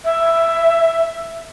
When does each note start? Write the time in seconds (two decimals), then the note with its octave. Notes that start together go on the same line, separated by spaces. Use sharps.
0.04 E5